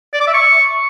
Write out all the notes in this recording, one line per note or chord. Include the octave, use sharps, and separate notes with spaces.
D5
D6
E5
C#6